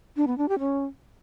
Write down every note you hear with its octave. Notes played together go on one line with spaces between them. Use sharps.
D4
B3
D4
G4
C#4